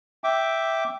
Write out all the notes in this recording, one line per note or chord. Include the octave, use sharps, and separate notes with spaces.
E5 G5 D6